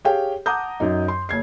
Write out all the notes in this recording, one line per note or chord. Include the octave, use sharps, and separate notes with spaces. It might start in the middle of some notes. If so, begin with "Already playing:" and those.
G4 G#4 C#5 F5 G5
F#5 A5 A#5 D6 D#6 G6
F#2 D#4
C6
F#1 G#6 C7